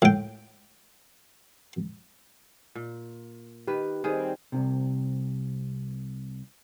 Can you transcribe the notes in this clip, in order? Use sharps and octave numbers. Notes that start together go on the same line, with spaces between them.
A2 G5
A#2
D#3 G4 B4
D#3 G3 C4 G#4
C2 G#2 C3